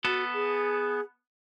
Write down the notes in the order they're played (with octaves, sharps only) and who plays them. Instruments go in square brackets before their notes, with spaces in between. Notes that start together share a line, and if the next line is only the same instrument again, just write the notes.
[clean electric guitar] B3 A4 [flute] F#4
[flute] G#4